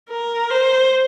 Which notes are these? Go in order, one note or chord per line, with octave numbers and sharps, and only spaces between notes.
A#4
C5